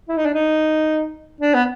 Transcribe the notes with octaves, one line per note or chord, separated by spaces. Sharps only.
E4
D#4
D4
D#4
D4
B3